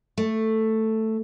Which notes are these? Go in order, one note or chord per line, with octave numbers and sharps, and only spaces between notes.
A3